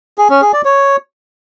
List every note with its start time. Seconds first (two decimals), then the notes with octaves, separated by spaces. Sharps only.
0.18 G#4
0.30 C#4
0.42 G#4
0.53 D5
0.65 C#5